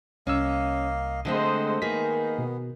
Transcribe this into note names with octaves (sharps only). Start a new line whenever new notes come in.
C2 A#3 C#4 D#5 F5 E6
D3 G#3 A3 C4 C5 D#5 F#5
D#3 A#3 B3 D#4 G#4 B6
B2